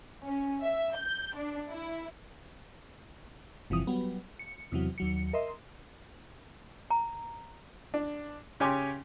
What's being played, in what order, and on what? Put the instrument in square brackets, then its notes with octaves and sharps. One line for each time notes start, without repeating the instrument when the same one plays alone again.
[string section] C#4
E5
G6
D4
E4
[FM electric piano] G1 C3 E3 F3 D#6
F#3 G3 B3
C#7
E2 C3 E3 F#3
D#2 F#3 C#7
A#4 D#5 E5 C6
[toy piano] A#5
[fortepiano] D4
C#3 G4 C#5 G#5 C6 D6